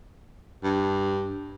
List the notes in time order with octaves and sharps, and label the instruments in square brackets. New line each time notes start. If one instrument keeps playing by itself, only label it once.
[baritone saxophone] G2